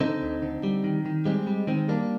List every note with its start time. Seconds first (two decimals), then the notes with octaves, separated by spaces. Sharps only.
0.01 D3 C4 D#4
0.22 D2
0.42 D3
0.63 G3
0.84 D#3
1.06 D#3
1.26 G3 G#3 C4
1.47 G3
1.67 D#3 G#3 C4
1.89 G3 A#3 D4